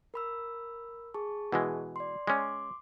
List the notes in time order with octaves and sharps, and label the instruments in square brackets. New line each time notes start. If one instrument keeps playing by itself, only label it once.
[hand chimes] A#4 B5 E6
G#4 A5 C#6
[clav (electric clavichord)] B2 E3 G#3
[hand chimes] D5 C6
[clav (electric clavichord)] G#3 C#4 [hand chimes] C6 D6